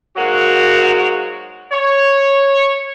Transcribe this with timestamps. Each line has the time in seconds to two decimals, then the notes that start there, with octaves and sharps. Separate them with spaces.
0.16 G#2 F#3 A#3 F#4
1.72 C#5